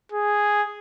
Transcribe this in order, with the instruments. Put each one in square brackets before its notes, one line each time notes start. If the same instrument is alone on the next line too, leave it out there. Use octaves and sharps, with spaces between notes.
[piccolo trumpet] G#4